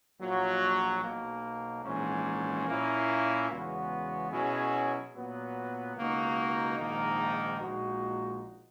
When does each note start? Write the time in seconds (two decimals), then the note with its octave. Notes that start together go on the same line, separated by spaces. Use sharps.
0.20 A#1 A#2 F#3
1.02 B1 B2 A#3
1.84 A#1 G#2 E3 A#3 C#4
2.67 A#2 A#3 C#4 E4
3.49 E2 C#3 G#3 B3 F#4
4.31 B2 F#3 C#4 E4 G#4
5.14 A#2 F#3 B3
5.95 C#2 B2 A#3 D#4 F#4
6.78 A#1 G#2 D#3 A#3 D#4
7.60 A#1 A#2 G#3 D#4 F#4